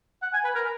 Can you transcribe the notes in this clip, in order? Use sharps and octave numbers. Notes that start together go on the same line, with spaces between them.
F#5
G#5
B4
A#4